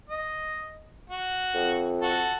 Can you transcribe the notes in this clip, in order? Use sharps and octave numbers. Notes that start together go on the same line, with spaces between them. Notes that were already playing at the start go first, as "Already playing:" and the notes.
D#5
F#4
F2
F#4 A4